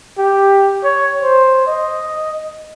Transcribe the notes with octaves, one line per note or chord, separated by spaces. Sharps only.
G4
C#5
C5
D#5